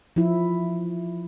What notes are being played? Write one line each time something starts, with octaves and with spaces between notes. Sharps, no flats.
F3 E4